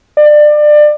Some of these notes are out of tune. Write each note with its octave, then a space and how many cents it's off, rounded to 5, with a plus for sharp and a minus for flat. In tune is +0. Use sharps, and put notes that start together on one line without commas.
D5 +25